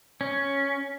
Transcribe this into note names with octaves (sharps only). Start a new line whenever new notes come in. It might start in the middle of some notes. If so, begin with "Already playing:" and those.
C#4